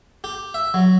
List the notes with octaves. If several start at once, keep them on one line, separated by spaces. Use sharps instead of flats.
G4
E5
F#3